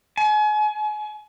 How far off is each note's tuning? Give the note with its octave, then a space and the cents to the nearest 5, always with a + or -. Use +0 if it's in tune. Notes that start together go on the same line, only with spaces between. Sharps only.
G#5 +35